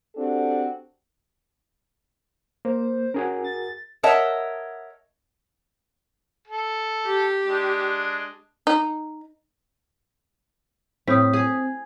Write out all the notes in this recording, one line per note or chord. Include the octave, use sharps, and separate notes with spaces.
C4 D4 F#4 G4 A4
A#3 C5
C#4 F#4 G#4 A#4
A6
A#4 C#5 D#5 E5 F#5 A5
A4
G4
G#3 D4
D#4
A2 C4 D#6 G6 B6
G#4